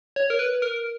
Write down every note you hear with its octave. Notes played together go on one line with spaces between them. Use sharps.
C#5
A#4
B4
A#4